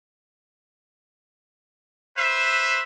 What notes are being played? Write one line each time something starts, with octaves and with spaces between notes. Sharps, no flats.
B4 C5 E5